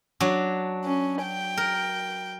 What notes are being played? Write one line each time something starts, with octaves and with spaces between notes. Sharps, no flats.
F#3 D4 F#4
C#4
G5
A#4